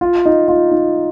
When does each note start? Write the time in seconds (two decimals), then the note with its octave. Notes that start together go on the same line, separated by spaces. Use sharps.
0.01 F4
0.26 D#4
0.48 F4
0.71 D#4